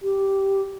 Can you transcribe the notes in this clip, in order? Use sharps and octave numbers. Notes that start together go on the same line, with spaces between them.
G4